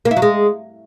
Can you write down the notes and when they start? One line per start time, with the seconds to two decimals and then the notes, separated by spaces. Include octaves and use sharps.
0.05 A#3
0.11 E4
0.17 F#3
0.22 G#3